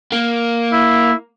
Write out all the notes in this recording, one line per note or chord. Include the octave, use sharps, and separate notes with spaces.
A#3
E4